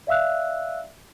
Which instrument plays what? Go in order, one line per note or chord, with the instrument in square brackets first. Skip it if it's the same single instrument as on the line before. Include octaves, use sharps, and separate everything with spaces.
[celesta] D5 E5 F5 E6 F#6